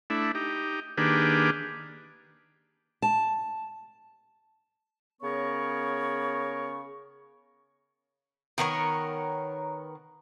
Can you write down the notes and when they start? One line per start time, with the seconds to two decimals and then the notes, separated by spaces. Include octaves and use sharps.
0.10 A3 D4 E4
0.35 D#4 G4
0.98 D#3 A#3 D4 G4 G#4 B4
3.02 A5
5.22 C#3 B3 A#4 C#5 C#6
8.58 D#3 B3 A#4 C#5